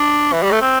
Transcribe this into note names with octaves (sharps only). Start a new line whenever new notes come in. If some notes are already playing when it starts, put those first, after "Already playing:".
Already playing: D4
E3
G3
A3
C4